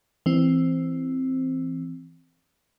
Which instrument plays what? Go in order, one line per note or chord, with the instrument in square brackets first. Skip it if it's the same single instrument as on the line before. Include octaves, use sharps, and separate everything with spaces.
[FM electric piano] E3 C4